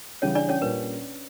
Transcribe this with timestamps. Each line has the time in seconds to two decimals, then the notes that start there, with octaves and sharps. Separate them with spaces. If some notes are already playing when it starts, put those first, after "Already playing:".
0.22 C#3 E3 G3 C#4 C#5
0.35 D4 D5
0.49 C#4 C#5
0.62 A#2 G3 A#3 C#4 B4